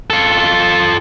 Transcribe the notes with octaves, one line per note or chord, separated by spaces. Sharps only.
F4 A4